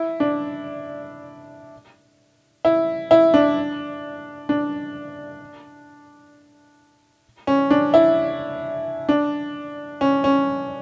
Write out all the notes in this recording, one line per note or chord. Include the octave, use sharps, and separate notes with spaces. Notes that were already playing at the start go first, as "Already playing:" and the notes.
Already playing: E4
D4
E4
E4
D4
D4
C#4
D4
E4
D4
C#4
C#4